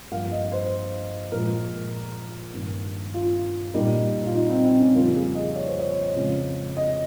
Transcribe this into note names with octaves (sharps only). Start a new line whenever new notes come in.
G2 F3 A#3 F5
D#5
C5
A#2 F3 G#3 A#4
G2 D#3 A#3
F4
A#2 G3 A#3 D#4
F4
D#4
C4
C4
C#4
F2 C#3 G3 A#3 F4
G#4
D#5
C#5
C5
C#5
F2 C#3 F3 G#3
D#5